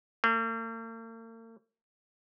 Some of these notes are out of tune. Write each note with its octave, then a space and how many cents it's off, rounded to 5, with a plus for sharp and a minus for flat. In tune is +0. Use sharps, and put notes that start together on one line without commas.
A#3 -45